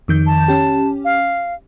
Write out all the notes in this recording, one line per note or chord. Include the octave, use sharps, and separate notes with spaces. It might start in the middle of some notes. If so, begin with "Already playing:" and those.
F2 D#3 G6
A5
C#4 G4
F5